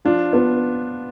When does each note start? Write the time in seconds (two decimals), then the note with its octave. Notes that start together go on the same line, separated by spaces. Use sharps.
0.05 F3 D4 F4
0.33 B3 D4 F4